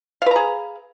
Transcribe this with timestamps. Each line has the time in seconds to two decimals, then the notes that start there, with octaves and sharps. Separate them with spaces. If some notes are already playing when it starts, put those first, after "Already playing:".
0.22 F5
0.26 B4
0.31 A#5
0.36 G#4